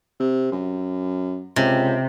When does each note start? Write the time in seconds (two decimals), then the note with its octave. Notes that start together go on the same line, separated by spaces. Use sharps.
0.20 C3
0.52 F#2
1.56 C#2 C3